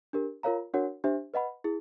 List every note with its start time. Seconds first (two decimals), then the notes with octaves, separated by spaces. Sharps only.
0.13 D4 G4 A#4
0.43 F4 A#4 C#5 F5 A#5
0.74 D4 F#4 A#4 C#5 F#5
1.04 D4 G4 C5 E5
1.34 B4 D#5 F#5 B5
1.64 E4 G#4